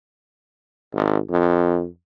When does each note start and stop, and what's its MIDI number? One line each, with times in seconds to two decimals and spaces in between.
0.94 1.18 32
1.30 1.86 41